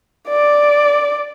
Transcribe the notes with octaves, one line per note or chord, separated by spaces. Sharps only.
D5